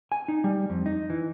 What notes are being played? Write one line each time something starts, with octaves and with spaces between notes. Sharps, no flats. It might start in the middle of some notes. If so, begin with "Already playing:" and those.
G#5
D#4
G3
F2
D#4
E3